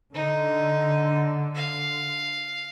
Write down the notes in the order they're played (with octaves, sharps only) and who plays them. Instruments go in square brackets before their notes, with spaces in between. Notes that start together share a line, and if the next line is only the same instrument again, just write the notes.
[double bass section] D3 [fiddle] D#4
[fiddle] F5